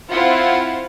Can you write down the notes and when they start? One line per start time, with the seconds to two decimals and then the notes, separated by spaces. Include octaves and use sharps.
0.11 C4 E4 F4 C5 F#5